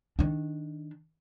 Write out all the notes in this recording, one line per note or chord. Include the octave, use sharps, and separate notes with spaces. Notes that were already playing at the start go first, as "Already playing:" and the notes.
D#3 D4